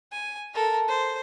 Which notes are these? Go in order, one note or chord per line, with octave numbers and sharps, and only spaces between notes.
G#5
A4 A#4
C5